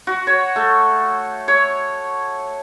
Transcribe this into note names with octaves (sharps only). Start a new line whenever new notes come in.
F#4
C#5
A3
C#5